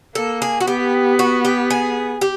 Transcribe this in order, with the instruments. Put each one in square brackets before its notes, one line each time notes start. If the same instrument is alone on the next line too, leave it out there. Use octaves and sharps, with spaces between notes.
[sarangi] A#3 [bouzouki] A4
[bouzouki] G#4
F#4
[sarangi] B3 [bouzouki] G4
[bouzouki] F#4
G4
G#4
G4